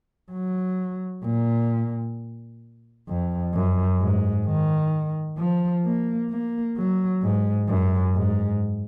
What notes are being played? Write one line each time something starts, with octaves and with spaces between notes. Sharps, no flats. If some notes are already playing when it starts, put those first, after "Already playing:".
F#3
A#2
F2
F#2
G#2
D#3
F3
A#3
A#3
F#3
G#2
F#2
G#2